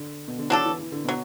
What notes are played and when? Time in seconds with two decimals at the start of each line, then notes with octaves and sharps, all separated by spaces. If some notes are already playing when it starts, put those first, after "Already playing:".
Already playing: D3
0.28 B2
0.39 D3
0.50 E3 F#3 D4 A4
0.65 E3
0.79 E3
0.92 D3
1.04 B2 F#3